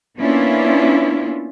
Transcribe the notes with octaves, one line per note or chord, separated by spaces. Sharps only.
A#3 B3 C#4 D4 E4 F4